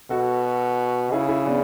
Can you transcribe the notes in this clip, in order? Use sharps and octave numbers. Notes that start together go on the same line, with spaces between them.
B2 F#4 A4
C#3 E4 G#4
E4 G#4
B3 D4